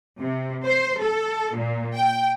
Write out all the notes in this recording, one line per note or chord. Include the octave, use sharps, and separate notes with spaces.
C3
C5
A4
A#2
G5